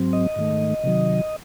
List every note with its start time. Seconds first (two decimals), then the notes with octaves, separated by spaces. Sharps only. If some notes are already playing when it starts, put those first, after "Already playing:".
Already playing: G#2 F#3 C4
0.13 D#5
0.36 G#2 D#3 A3
0.83 C3 D#3 F#3